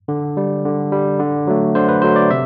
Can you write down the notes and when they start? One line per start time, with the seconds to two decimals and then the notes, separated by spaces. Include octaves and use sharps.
0.08 D3
0.37 G3
0.65 D3
0.92 G3
1.19 D3
1.47 F#3 A3
1.75 D3 C5
1.89 B4
2.02 F#3 A3 C5
2.16 D5
2.30 C3 E5